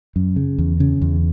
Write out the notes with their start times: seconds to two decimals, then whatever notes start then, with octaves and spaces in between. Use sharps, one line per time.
0.16 F#2
0.36 C#3
0.58 E2
0.80 C#3
1.02 E2